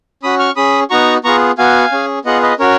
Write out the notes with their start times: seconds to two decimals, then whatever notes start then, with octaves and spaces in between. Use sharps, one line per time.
0.23 C#4 F#4 B5 D#6
0.39 C#6 F6
0.56 C#4 G#4 B5 D#6
0.90 B3 D#4 F#4 A#5 C#6
1.24 B3 F4 G#4 A#5 C#6
1.58 B3 F#4 F5 G#5
1.92 C#4 G#4
2.25 B3 F4 G#4 D#5 F#5
2.42 B4 D#5
2.59 C#4 F#4 A#4 C#5